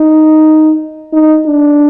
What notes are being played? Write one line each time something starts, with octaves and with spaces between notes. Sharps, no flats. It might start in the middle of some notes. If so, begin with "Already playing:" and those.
Already playing: D#4
D#4
D4